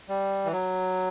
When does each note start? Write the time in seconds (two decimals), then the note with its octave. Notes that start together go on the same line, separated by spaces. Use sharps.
0.08 G3
0.45 E3
0.52 F#3